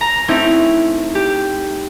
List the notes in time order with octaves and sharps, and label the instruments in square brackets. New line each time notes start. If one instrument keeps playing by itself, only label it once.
[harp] A#5
A3 C4 C#4 D#4 E4
G4